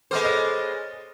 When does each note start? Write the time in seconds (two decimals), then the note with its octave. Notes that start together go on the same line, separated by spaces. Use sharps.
0.11 G#3 B3 A4 C5 D6 F6
0.25 C#5 D#5 F6 A6